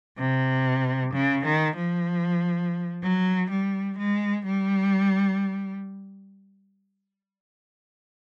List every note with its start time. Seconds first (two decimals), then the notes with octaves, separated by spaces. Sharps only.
0.18 C3
1.13 C#3
1.45 D#3
1.76 F3
3.03 F#3
3.50 G3
3.98 G#3
4.45 G3